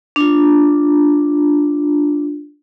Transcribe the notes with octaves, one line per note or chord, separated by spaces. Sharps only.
D4 F4